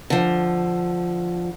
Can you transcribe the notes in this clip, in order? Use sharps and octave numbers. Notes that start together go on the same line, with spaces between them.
D3 F3